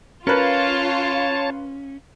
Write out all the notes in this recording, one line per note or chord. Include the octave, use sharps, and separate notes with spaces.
C#4 F4 A#4 B4 C#5 A5